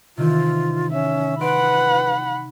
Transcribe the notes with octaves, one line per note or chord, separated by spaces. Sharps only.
C3 D#3 E3 F4
C#4 E5
D#4 B4 F#5 B5 C6 D7